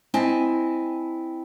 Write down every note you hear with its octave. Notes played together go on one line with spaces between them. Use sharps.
C4 E4 D#5 G#5 A5